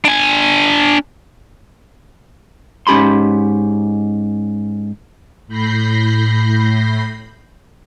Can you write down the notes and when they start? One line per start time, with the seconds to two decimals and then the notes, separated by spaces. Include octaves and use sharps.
0.05 D4 G#5
2.87 G#2 C#4 G4 B5 C6
5.47 A2 B5 G6 A#6 C7